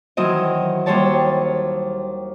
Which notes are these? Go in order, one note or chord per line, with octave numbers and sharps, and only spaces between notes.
D#3 E3 F#3 C4 D#5
D#2 G3 C5 C#5 A5